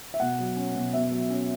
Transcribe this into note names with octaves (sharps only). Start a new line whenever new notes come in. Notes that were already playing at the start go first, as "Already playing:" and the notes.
E5
B2 F#5
F#3
C#4
B2
B2 E5
F#3
C#4